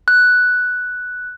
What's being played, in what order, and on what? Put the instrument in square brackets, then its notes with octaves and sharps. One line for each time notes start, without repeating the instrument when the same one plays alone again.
[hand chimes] F#6